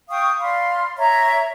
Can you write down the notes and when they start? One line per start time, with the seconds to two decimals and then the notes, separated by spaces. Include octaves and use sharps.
0.10 F5 G5 C#6 D#6
0.41 D5 F5 B5 C6
0.97 C#5 E5 A#5